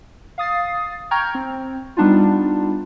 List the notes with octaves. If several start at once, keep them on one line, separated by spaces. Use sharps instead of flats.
F5 D#6 A6 C7
G5 A#5 C#6 F6 G6 G#6
C4
G3 B3 D4 D#4 F4